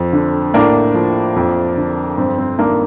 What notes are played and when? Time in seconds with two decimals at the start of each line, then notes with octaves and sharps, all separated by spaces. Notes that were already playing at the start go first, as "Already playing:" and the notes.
Already playing: F2
0.13 D3
0.54 A2 A#3 D4
0.94 F3
1.36 F2
1.77 D3
2.18 G2 C4
2.38 C4
2.59 D#3 A#3 D4